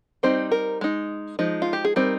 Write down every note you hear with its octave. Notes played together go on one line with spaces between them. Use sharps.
G3 C4 D#4 C5
A#4
G#3 D#4
F3 G#3 D#4
F4
G4
G#4
G3 C4 D#4 A#4